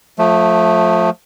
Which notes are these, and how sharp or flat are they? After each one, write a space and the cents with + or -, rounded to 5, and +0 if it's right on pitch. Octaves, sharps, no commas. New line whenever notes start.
F3 +25 A3 -5